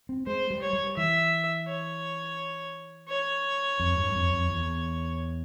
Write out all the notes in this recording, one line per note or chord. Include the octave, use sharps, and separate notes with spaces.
C4
G#3 C5
G3
C#5
G3
E3 E5
C#5
C#5
F2
G2
F2
F2
E2